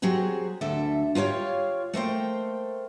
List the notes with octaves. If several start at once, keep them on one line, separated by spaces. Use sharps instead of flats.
F#3 C4 G4 G#4
D2 D4 A4 E5
F4 G4 A4 C#5 F5
A3 A#3 C5 G5